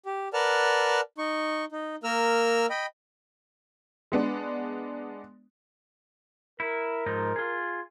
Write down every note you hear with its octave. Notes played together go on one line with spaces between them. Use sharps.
G4
A#4 B4 D5 F#5 A5 F6
D#4 C#6
D#4
A#3 A#4 E6 F6
D#5 G5 B5
G#3 B3 D4
E4 A#4
G#2 F3 D#4
F4 G#4